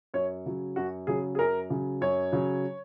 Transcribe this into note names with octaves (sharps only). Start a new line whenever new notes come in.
F#2 C#5
C#3 F#3
F#2 F#4
C#3 F#3 G#4
G#4
F#2 A#4
C#3 F#3
F#2 C#5
C#3 F#3